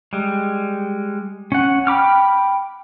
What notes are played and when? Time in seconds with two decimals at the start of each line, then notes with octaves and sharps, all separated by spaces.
0.13 G3 G#3
1.52 C#4 F#5
1.87 G5 B5 D6 F6